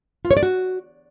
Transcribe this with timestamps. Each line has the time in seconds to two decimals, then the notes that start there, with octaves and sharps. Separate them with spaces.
0.25 F4
0.31 C#5
0.37 D5
0.43 F#4